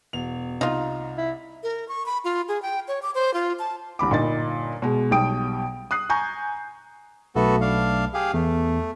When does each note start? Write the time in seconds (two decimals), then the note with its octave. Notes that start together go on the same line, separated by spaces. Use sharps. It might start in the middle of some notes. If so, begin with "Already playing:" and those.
0.13 E1 F7
0.61 C2 D#4 F4
1.18 E4
1.63 A#4
1.89 C#6
2.06 B5
2.24 F4
2.48 G#4
2.62 G5
2.88 C#5
3.02 D6
3.15 C5
3.34 F4
3.59 A5
3.99 C2 D3 B5 D6
4.10 G1 A#2 D#4 D#5 A6
4.82 B2 G#3
5.11 B1 B2 G3 G5 D#6 D7
5.91 D#6 F#6 C7
6.10 G#5 A#5 C#6 G6
7.36 B1 A3 B3 F#4 A4
7.61 D4 F5
8.14 G4 G#4 F5
8.34 E2 A3